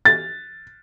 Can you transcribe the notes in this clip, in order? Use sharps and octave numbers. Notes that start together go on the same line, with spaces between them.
A6